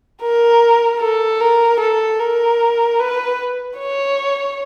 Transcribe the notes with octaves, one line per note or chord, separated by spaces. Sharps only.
A#4
A4
A#4
A4
A#4
B4
C#5